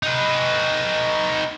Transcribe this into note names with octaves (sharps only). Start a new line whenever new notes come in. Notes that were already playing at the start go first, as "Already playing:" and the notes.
D#4 B4